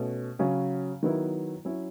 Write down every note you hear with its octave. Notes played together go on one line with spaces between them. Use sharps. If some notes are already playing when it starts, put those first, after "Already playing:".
Already playing: B2 A3 C#4
C#3 F#3 C#4
D#3 F#3 B3 E4
F#3 C#4 E4